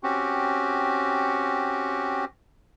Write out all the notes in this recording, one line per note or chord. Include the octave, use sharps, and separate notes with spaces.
C4 C#4 F#4 G4